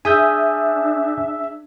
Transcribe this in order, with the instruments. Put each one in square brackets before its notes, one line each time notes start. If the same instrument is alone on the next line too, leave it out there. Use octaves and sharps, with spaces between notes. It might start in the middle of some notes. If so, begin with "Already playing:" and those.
[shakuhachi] D4 [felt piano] G#4 [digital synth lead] E5 [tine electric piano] G#5 D#6 G6